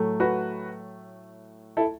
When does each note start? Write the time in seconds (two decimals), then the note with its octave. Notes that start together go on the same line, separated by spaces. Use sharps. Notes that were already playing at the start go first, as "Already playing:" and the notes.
Already playing: A2 F#3 A3
0.20 F#4 B4
1.77 E4 A4